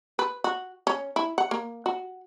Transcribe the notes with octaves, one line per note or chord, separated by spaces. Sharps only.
B4
F#4
C#4
E4
F#5
A#3
F#4